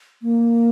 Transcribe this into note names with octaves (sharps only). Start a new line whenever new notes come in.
A#3